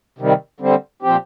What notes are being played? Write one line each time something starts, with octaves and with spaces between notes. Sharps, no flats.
C3 D#3 G3
D3 G3 C4
A#2 F3 C4 G4